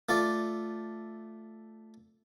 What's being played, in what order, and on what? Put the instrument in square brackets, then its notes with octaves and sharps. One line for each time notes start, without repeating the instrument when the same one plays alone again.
[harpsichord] A3 F4 D5